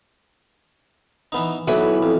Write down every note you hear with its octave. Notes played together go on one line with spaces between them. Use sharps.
E3 B3 D#4
B1 E3 F#3 B3
F2